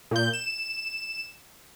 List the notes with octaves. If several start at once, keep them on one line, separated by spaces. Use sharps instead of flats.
A#2 G6
E7